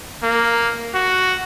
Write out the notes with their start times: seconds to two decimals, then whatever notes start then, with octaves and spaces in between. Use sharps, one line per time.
0.23 A#3
0.95 F#4